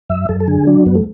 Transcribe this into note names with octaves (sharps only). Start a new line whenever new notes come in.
F#2 E5
F#2 A4
A4
D3 G#4
F#3 D4
F#2 B3
A3